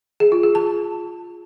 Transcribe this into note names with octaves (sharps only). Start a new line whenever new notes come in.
G#4
F4
G#4
A5